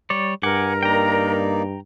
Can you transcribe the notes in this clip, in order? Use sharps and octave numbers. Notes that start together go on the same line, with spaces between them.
G3 C#5 D5
G2 A#4 F#5 G#5 D6
A#3 D#4 D5 G5 A#5